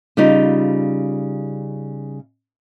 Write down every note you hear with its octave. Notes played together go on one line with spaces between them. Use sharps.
C#3 G3 D#4 F4